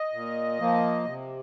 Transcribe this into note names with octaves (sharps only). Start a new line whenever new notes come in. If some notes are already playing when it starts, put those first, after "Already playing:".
Already playing: D#5
A#2
F3 A#3
C3